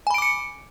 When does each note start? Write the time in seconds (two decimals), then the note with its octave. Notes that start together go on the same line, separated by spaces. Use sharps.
0.07 G#5
0.11 B5
0.14 D7
0.18 D6
0.22 C#7